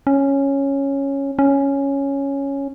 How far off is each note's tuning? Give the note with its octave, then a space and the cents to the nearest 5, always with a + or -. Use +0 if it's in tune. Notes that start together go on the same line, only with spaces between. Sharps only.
C#4 -5
C#4 +0